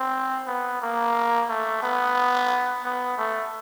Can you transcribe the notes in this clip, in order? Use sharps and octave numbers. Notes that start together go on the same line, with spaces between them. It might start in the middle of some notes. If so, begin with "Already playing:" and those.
Already playing: C4
B3
A#3
A3
B3
B3
A3